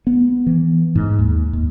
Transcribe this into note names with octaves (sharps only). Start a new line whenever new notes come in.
B3
E3
G#2
D#2
D#2